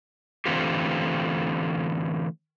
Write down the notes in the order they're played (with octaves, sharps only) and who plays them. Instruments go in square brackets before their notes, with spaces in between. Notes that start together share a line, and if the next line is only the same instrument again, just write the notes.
[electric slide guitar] D3 E3 A3 C4 F4 G4